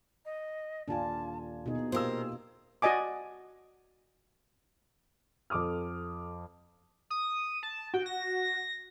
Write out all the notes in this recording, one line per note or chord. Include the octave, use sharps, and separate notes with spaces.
D#5
D#1 D4 F4 G#5 A5
B2 D#4 G#4
A#2 F4 G4 A#4 C5 E6
F#4 D5 D#5 G#5 D6
F2 A4 D6 D#6 F6
D#6
A5
F#4 G5
A#6